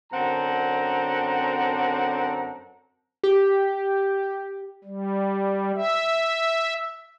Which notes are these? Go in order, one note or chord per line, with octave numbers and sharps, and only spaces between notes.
F#2 D3 C4 F#5 A5 A#5
G4
G3
E5